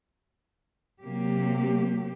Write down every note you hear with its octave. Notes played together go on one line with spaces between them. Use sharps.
C3 F#3 A#3 G4